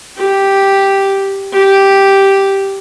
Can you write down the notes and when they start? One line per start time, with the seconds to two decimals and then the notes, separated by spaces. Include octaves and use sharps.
0.17 G4
1.52 G4